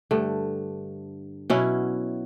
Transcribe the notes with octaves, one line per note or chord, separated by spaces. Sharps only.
G2 D3 A3
B2 F#3 C#4 E4